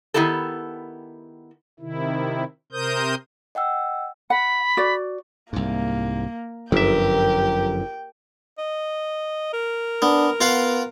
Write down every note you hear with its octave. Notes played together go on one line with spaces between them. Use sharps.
D#3 B3 E4 G4 A4
C3 D#3 E4
C3 A#4 C5 D#6 G6
D#5 F#5 G5 E6
F#5 B5
F#4 D5
C2 G#2 A#3
G1 F#2 D3 F3 G4 A#4 E5 G5
D#5
A#4
B3 D4
B3 F4 F5 F#5